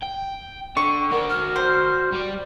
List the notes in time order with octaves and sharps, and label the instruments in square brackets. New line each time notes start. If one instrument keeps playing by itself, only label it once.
[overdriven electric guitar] G5
[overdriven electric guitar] D3 [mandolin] C#6
[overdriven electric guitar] F#4 D5 [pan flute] A#4
[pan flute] F6
[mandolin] C5
[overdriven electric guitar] G3 D5